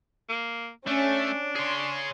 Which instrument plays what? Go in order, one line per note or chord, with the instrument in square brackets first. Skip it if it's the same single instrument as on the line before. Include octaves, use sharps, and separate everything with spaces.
[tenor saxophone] A#3
[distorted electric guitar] A3 [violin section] C#4 [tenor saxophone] D4
[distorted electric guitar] G#4 C#5 [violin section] C6